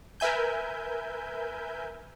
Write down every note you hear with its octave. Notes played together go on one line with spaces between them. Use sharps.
A#4 B4 E5 G#5 G6